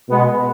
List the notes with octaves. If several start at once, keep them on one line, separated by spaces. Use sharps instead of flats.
B2 G#3 B3